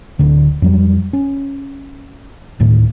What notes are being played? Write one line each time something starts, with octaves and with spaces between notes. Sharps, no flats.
D1 D2 D3
F2 F#3 G3
C#4
D1 A2 D#3